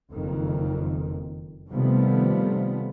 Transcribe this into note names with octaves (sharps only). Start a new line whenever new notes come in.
F#1 F2 D#3
C3 D#3 F3 G3 A3 B3